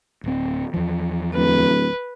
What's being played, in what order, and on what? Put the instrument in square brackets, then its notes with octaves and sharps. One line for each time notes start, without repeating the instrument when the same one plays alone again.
[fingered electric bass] D1 C4
E2 F3
[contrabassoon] D1 [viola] B4